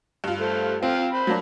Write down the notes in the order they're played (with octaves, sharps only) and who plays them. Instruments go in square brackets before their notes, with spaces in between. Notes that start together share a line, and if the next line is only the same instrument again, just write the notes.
[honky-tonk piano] G2 F4
[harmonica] A3 C5
[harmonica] F3 F5 G5 [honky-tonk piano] C4
[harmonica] C5 B5
[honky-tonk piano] F#3 A#3 D4